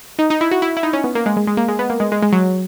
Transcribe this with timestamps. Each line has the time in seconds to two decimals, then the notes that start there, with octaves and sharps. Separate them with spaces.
0.19 D#4
0.30 D#4
0.41 E4
0.51 F#4
0.62 E4
0.77 E4
0.83 D#4
0.93 C#4
1.04 B3
1.15 A#3
1.26 G#3
1.37 G#3
1.47 G#3
1.57 A#3
1.68 G#3
1.79 B3
1.90 A#3
2.00 G#3
2.12 G#3
2.22 G#3
2.33 F#3